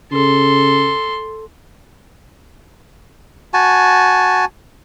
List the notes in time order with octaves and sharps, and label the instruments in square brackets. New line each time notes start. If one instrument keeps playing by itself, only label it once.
[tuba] C#3 [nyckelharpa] A4 C6
[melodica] F#4 G#5 A5